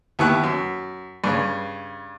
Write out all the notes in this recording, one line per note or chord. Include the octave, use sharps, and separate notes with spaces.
D#2 B3 E4 G4 C#6 F#6
F#2
G2 C#3